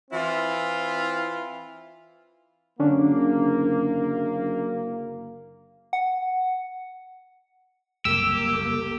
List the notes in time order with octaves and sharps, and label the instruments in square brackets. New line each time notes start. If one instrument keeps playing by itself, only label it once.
[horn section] E3 C4 E4 F4
[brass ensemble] F#1 A#3 [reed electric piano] D3 C#4 D4
[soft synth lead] F#5
[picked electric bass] F#1 C2 [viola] A#3 [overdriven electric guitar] G4 [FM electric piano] E6